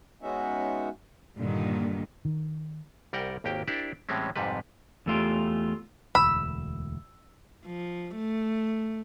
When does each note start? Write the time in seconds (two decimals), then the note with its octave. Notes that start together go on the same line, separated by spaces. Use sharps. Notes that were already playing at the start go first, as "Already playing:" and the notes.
0.22 G#3 B3 C#4 D#4 F#4 E5
1.39 G2 A#2 D3 D#3
2.25 D#3
3.13 C2 G3 A#4 F#5 G5
3.44 G#1 D#2 A#3 G4 G5
3.67 D4 E4 G4 A#4 C5 D5
4.09 A2 E3 G3 G#3 C4 C#4
4.36 F2 G#2 C3 G3 B4
5.06 E2 A3 F4 G4
6.15 E1 D2 B5 E6
7.65 F3
8.15 A3